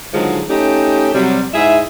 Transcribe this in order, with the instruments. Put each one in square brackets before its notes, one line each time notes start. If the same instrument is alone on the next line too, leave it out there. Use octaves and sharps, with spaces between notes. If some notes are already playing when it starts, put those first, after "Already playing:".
[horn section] D3 D#3 F3 F#3 G#3
A3 C#4 D#4 G4
C3 F#3 G3
G#2 E4 G#4 E5